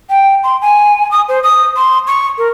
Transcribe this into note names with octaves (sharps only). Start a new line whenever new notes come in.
G5
C6
G#5
D#6
C5
D#6
C6
C#6
A#4